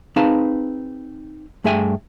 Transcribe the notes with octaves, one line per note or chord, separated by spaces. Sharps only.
C4 D#4 G#4 B4 F5 A5
G2 A3 G#4 E5 G5 G#5